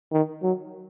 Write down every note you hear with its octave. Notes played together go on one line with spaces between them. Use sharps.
D#3
F#3